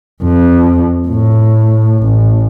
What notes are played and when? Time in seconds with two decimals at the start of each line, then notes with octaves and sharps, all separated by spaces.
0.23 F2
1.08 A2
2.04 A1